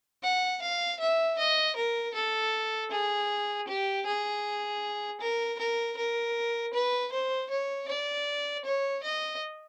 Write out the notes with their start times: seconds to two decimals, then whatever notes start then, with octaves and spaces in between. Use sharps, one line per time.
0.23 F#5
0.62 F5
1.00 E5
1.38 D#5
1.76 A#4
2.14 A4
2.91 G#4
3.68 G4
4.06 G#4
5.21 A#4
5.59 A#4
5.97 A#4
6.73 B4
7.12 C5
7.50 C#5
7.88 D5
8.65 C#5
9.03 D#5